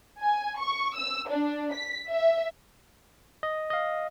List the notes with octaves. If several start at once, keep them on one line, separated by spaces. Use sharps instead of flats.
G#5
C#6
E6
D4
B6
E5
D#5
D#5 F5